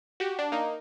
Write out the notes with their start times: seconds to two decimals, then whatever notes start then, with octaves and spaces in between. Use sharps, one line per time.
0.20 F#4 G4
0.39 D4
0.52 A#3 D#4